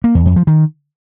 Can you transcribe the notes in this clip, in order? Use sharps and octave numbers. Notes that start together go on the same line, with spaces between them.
A#3
E2
F2
F3
D#3